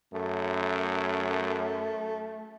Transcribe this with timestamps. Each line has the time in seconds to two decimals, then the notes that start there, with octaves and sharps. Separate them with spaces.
0.14 F#2 A3